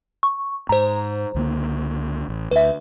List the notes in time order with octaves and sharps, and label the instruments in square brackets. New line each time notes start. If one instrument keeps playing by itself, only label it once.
[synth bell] C#6
[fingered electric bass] G#2 [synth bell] C5 A#5
[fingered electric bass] C#2 D3 A#3
A1
[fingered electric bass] D2 [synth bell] B4 E5